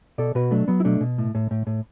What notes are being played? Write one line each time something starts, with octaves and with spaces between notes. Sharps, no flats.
B2 A4 D5
B2 F#4 B4
F#3 A3 D4
F#3 B3
E4
B2 A3 D4
B2
A2
A2
A2
A2